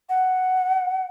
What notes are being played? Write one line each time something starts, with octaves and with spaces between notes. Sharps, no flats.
F#5